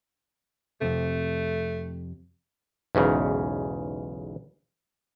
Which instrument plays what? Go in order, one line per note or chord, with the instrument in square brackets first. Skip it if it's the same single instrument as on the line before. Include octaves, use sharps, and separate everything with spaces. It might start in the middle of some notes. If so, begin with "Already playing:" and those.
[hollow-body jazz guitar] F2 C3 [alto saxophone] A3
[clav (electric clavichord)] B1 E2 G#2 C#3